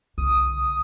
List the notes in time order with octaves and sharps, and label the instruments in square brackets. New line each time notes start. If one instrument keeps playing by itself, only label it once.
[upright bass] C2 D3 [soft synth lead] D#6